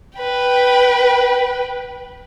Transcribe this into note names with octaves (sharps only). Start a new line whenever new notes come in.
B4 G5